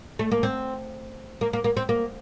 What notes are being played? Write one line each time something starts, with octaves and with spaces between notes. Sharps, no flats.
A3
A#3
C4
A#3
A#3
A#3
C4
A#3